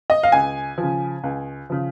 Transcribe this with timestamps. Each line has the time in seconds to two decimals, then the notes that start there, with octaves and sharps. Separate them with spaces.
0.10 D#5
0.23 F5
0.32 C#2 G#5
0.78 F3
0.83 C#3
1.24 C#2
1.70 C#3 F3